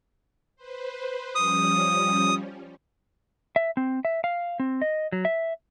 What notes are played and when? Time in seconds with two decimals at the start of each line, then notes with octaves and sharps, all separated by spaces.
0.56 B4 C5
1.35 F3 G3 C#4 D#6
3.56 E5
3.77 C4
4.05 E5
4.24 F5
4.60 C4
4.82 D#5
5.12 F#3
5.25 E5